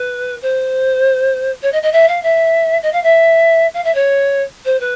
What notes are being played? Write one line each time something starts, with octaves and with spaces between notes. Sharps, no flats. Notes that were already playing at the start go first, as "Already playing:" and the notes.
Already playing: B4
C5
C#5
D#5
D#5
E5
F5
E5
D#5
F5
E5
F5
E5
C#5
C5
B4